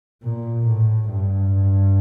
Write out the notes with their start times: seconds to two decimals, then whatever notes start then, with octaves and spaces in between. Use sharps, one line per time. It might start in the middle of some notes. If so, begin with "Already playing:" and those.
0.23 A#2
0.67 A2
1.10 G2